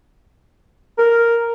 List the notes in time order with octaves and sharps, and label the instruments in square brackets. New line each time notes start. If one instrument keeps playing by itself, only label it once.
[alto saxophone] A#4